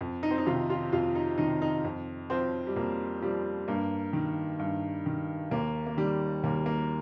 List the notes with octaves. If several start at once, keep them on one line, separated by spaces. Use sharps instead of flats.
F2
D#4
C4
D#4
C3 D#3 F4
F4
F2 F4
D#4
C3 D#3 D#4
D#4
F2
F3 C4
G3
F2 A#3
F3 G3
G2 A#3
D#3
G2
D#3
D#2 A#3
A#3
D#3 G3
D#2 A#3
A#3